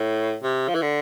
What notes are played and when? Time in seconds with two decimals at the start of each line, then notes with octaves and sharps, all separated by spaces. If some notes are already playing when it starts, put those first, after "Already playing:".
Already playing: A2
0.43 C3
0.68 F3
0.75 E3
0.82 D3